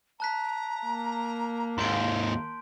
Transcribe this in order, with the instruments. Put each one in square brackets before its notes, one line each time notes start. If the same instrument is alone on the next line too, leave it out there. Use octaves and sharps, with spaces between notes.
[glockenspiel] A5 F#6 B6 [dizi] A#5
[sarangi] A#3
[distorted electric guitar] D#2 G#2 [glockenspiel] C6 G6 D7